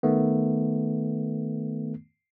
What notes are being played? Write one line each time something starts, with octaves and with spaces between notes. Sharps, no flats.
D#3 A3 B3